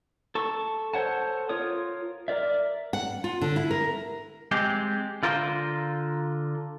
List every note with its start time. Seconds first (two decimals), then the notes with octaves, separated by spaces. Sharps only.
0.35 A4 A5 C#6
0.94 A4 C5 C#5 F#5 A5
1.49 F4 A#4 C#5 D#6
2.28 A#4 D5 E5
2.93 F#5
3.24 F4
3.41 D3
3.56 E4
3.71 A#4
4.51 G#3 C4 G4
5.23 D3 F4 A#4 C5